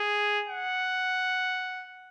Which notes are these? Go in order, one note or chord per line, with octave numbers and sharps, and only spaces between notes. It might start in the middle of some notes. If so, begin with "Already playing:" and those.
Already playing: G#4
F#5